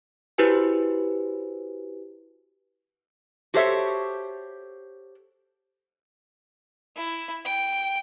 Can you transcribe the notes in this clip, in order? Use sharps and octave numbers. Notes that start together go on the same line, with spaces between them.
E4 F#4 G4 B4 C5 G#5
F#4 G4 A4 C5 C#5 E5
E4
G5